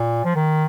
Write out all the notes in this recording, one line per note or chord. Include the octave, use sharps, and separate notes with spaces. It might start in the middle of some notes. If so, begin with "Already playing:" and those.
Already playing: A#2
F3
D#3